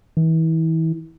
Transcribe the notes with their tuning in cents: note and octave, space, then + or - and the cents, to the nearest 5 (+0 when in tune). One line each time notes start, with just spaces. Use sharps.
E3 -35